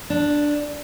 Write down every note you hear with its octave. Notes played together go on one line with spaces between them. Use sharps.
D4